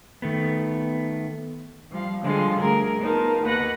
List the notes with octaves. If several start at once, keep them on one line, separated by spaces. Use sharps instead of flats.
D#3 A3 B3
F3 G3 F5
D3 F3 G3 G#3 F4
D2 G#4 A#4
B3 D#4 F4 A#4 A5
D#2 B4 F#5 F#6 A#6